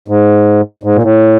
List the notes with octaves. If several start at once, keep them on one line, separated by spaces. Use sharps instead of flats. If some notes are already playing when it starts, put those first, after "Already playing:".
G#2
G#2
A#2
A2